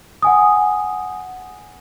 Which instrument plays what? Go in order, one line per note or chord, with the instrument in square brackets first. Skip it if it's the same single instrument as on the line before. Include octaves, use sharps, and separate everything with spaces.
[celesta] F#5 G#5 D#6